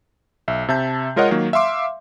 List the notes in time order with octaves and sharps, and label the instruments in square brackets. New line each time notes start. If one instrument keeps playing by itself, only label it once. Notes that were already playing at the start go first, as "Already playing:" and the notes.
[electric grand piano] B1 E5
C3 E5 A5 G6
G#3 F4 A#4 C#5 D#5 F#5
D#3 F#3 A#3
E5 F5 C6 D6